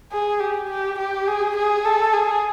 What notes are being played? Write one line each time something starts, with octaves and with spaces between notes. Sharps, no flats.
G#4
G4
G4
G4
G#4
G#4
A4
G#4